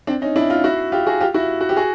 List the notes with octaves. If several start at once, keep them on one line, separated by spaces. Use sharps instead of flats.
C4 D4
C#4 D#4
D4 E4
D#4 F4
E4 F#4
F4 G4
F#4 G#4
F4 G4
E4 F#4
F#4
G4
F#4 G#4